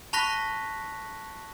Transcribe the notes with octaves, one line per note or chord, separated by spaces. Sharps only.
A5 B5 C#6 F#6 A#6 B6